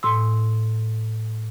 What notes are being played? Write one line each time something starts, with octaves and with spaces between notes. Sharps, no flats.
A2 C6 E6